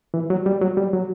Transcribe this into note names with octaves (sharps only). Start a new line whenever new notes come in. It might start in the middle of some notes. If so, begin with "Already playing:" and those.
E3
F#3
G3
F#3
G3
F#3